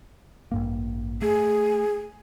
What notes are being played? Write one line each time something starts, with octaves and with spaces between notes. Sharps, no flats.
A1 G2 A#3
A3 G#4